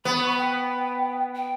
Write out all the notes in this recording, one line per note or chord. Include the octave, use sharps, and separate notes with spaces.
B3 B5
C#6
B5
G5
G5